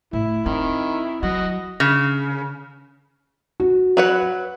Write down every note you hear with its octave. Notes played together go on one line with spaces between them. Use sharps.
A2 E4
D#3 C4
F#3 F#4 D#5
C#3
F#4
F#3 B4 F#5